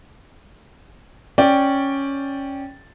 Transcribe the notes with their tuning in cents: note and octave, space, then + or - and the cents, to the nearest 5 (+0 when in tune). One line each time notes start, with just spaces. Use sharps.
C#4 -5 D5 -5 G5 +0